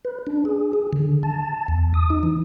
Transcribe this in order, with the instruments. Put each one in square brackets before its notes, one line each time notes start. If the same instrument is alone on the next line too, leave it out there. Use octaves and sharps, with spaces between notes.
[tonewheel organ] B4
D4
G#4
G#4
D3
A5
E2
D#6
D#4
E3